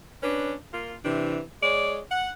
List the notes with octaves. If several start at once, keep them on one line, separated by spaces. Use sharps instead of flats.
C#4 D4 B4
A#3 F4
C3 E3 D4
G#3 C#5 D5
F#5